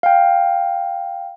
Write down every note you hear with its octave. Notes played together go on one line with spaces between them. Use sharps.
F5 G5